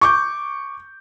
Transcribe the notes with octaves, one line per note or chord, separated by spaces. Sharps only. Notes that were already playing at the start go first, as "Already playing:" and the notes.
C#6 D6 G6